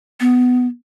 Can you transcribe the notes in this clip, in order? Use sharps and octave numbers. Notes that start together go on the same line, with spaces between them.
B3